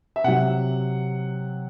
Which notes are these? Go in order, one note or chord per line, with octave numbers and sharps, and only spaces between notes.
E5
C3 F#3 F#5